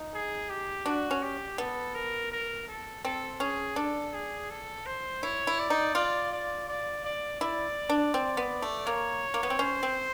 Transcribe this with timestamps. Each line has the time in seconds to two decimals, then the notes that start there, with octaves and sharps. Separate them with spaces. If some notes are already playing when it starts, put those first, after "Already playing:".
Already playing: D#4
0.13 G#4
0.49 G4
0.86 D4 F#4
1.11 C#4
1.22 G4
1.58 B3 A4
1.95 A#4
2.31 A#4
2.68 A4
3.04 C4 A4
3.40 C#4 G#4
3.76 D4 A4
4.13 G#4
4.50 A4
4.86 C5
5.23 E4 C#5
5.47 E4
5.59 D5
5.70 D#4
5.95 F4 D5
6.32 D5
6.68 D5
7.04 D5
7.41 E4 D5
7.90 D4
8.14 C4
8.37 B3
8.62 A3
8.86 A#3 C#5
9.34 A#3
9.43 B3
9.50 C4
9.59 C#4 C5
9.83 C4